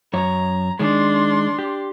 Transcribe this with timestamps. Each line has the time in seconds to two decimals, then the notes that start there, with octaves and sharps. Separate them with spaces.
0.14 F#2 C#5 A#5
0.79 D#3 G#3 D4 C6
1.59 G4